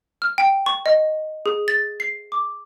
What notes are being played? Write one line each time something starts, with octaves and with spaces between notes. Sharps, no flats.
F6
G5
C#6
D#5
G#4
A6
C7
D6